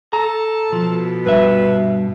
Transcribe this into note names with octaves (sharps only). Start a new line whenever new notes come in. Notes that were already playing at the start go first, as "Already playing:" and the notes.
A4 A#5
B2 F3
G2 B4 E5